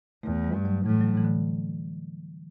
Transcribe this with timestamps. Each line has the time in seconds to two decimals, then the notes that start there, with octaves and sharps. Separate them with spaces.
0.23 E2 A3
0.44 G3
0.55 G2
0.65 F#3
0.85 A2 E3
1.01 F#3
1.17 E3
1.24 D3